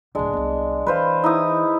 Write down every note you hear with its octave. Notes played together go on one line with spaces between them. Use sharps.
D1 D2 G#3 D4
C2 B3
E3 B4 C5 F5
D#4 E4 D#6